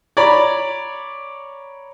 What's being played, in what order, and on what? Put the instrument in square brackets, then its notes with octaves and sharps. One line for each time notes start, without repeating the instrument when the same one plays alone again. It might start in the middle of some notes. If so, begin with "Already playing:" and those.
[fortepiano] C#5 D5 A#5 B5